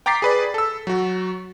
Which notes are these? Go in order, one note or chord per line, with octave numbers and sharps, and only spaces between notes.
G5 A#5 D6 A6 B6 C7
G#4 B4 D5
A4 E6
F#3 F#4